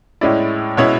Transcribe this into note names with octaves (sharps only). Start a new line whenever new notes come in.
A2 G#3 C#4 E4 D5
B2 G#3 C#4 E4 C#5